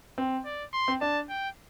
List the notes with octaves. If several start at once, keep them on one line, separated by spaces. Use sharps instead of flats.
C4
D5
C6
C4
D4 A5
G5